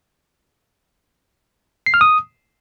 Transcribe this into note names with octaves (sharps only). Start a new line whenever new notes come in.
C7
F6
D#6